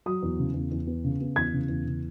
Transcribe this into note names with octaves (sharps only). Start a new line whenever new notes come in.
F#3 D#6
E2
C#3
E2
E2
B3
C#3
B3
E2 G#6
C#3
E2
C#3